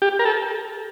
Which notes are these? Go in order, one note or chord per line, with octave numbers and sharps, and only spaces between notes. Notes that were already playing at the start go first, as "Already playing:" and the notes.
G4
A#4
A4